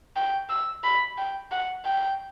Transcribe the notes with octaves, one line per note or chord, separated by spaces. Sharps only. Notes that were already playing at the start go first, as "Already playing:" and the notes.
G5
E6
B5
G5
F#5
G5